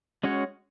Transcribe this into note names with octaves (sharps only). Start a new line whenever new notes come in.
G#3 C#4 F#4 C#5